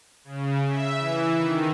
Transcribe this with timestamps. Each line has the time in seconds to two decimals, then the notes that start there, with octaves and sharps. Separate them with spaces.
0.24 C#3
0.68 E5
0.98 E3
1.36 D#3